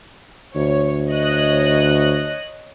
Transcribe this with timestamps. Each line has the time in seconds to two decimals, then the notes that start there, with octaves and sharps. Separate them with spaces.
0.55 D2 C#5
1.10 C#5 D#5 F#6